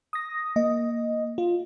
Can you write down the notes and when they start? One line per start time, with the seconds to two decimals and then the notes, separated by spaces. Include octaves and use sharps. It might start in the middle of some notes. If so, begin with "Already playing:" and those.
0.13 D#6 A#6
0.56 A#3 D#5
1.38 F4